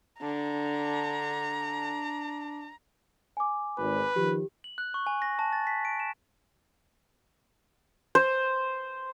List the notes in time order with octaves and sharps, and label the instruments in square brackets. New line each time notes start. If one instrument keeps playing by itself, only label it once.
[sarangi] D3 [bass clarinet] D4 [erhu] A#5
[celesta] G#5 D6
[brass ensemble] G#1 [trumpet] B4
[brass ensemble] D#3 F3 [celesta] G4
[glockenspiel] F#7
F#6
C#6
G#5
A#6
A5
A6
B6
D7
E7
[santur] C5